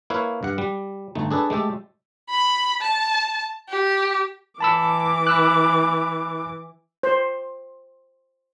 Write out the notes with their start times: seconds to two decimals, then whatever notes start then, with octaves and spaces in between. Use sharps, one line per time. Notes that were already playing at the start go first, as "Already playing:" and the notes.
0.10 A#3 E4 B4 C#5 F5
0.43 G2 F#5
0.58 G3
1.15 G1 A3 D#4
1.31 D4 G#4 A4 B4
1.50 G#3 A3 G4 A4
2.30 B5
2.81 A5
3.69 G4
4.61 E3 A5 B5 D6 E6
5.27 B5 E6 F#6
7.03 C5